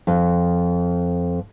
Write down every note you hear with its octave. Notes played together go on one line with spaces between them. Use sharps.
F2